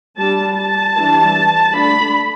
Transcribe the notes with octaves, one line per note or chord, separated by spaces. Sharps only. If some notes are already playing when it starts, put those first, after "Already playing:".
G3 D4 A5
A5
E3 G3 D4
D3 A3 D4 B5